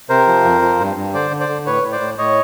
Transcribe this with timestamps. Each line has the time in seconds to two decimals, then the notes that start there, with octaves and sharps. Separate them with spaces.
0.09 C3 A#4 C5
0.27 F3
0.44 F2
0.62 F3
0.80 G2
0.96 G2
1.14 D3 C5 D5
1.31 D3
1.40 C5 D5
1.49 D3
1.66 A2 B4 C#5
1.84 A2
1.92 C5 D5
2.00 A2
2.18 A2 C#5 D#5